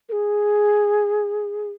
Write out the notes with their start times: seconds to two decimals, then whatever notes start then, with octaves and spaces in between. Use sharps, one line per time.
0.09 A#4
0.12 G#4